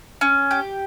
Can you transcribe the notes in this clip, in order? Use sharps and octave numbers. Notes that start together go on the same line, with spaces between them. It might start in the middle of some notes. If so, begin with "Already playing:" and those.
C#4
G4